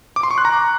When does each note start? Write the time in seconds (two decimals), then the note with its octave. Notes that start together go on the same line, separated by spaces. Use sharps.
0.16 D6
0.23 C6
0.31 C#6
0.38 F#6
0.45 A#5